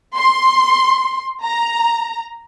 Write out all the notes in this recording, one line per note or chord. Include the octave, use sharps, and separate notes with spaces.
C6
A#5